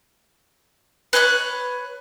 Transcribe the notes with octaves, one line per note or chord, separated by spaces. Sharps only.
B4 C#5 E5 F#6